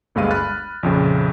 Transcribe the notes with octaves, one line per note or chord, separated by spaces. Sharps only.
G1 D2 G2 G#3 F5 D#7
B5 F6 F#6 A6
A#1 F2 C#3